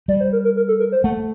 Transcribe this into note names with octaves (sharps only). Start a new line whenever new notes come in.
G3 D5
C5
A#4
A#4
A#4
A4
A#4
C5
A3 F#5